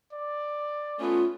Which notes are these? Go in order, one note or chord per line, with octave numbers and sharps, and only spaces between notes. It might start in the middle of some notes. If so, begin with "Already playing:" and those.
D5
A3 B3 C#4 F4